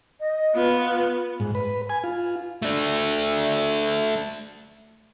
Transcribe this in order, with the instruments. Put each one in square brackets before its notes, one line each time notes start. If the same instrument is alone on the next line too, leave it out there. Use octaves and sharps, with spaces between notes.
[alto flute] D#5
[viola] B3 [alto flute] F4
[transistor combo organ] G#2
B4
G#5
F4
[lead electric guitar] A3 D4